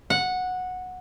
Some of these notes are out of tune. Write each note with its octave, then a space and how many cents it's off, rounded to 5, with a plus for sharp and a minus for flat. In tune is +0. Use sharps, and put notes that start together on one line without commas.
F#5 -10